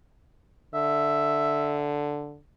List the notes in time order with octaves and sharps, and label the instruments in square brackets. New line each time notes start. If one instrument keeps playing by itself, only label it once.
[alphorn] D3 [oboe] E5